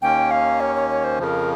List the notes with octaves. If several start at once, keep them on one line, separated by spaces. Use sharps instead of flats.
D#2 D#3 A#3 C#4 G5
F5
C#5
C#5
C#5
C5
F2 C#3 F3 A#4 C5